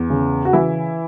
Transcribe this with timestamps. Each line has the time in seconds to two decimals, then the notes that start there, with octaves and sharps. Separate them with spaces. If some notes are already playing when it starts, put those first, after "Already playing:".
Already playing: E2
0.10 C#3
0.45 F#4
0.53 E3 E4